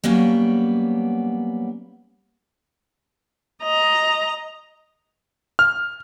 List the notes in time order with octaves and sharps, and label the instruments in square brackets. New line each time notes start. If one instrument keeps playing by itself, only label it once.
[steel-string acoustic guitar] F#3 G3 A#3 B3 C#4
[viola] D#5 A#5
[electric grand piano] F6